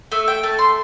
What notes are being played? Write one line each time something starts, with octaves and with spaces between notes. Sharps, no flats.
A3 E5
G5
A3 A5
C6